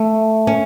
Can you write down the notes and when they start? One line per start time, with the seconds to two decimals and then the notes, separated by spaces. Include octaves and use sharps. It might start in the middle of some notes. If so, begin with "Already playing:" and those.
Already playing: A3
0.47 C#4